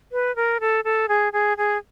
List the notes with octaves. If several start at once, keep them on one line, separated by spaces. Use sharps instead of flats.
B4
A#4
A4
A4
G#4
G#4
G#4